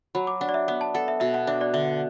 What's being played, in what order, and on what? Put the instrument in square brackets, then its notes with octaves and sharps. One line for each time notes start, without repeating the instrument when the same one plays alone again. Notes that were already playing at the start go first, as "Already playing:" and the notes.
[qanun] F#3 [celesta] B5
[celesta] D6
[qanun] D4 [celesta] F#5
[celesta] D5
E5
[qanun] B3 [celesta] F#5
[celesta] A5
[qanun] A4 [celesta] F#5
[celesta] E5
[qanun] B2 [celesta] E5
[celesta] F#5
[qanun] D4 [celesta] E5
[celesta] D5
[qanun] D3 [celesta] E5